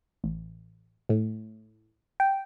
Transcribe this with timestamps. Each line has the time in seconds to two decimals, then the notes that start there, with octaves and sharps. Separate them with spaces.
0.24 A1
1.09 A2
2.20 G5